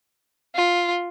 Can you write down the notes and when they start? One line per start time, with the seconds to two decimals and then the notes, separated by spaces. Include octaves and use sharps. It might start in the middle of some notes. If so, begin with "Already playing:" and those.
0.55 F4